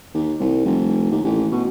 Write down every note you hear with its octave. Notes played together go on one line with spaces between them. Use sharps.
D#2
C2
F1
D#2
A1
B2